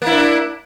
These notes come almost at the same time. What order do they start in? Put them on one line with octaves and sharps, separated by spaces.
A#3 E4 D4